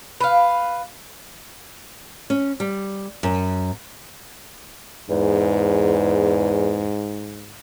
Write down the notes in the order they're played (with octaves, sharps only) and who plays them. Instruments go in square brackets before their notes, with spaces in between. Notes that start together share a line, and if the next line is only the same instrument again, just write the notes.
[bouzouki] B4 F5
[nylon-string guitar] C#4
G3
F#2
[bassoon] E2 [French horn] G#2